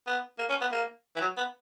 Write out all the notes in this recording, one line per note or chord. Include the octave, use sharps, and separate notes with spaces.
B3
A#3
C#4
B3
A#3
E3
F#3
B3